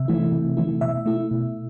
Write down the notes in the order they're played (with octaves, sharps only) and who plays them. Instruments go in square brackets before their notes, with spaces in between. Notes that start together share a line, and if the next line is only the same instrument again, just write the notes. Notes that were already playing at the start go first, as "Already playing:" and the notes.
Already playing: [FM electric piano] C3 E5
E3 A3 E4
C3
E3 A3 E4
B2 E5
A3 E4
B2